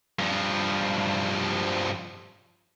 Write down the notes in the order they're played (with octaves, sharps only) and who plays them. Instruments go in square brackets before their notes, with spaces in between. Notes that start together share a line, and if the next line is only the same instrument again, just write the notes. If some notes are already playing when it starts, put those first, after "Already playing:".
[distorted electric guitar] G2 F3